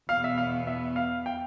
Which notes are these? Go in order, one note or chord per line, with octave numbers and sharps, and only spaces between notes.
E2 B2 B3 F5
E5
F5
E5
F5
G5